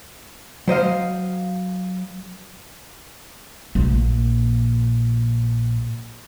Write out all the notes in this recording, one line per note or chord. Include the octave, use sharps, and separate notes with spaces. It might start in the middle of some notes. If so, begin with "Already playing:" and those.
F#3 C5 D#5 F5
A#1 A#2